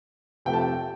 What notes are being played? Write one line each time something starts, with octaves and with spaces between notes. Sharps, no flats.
F2 C3 F3 A3 G5
A5
G5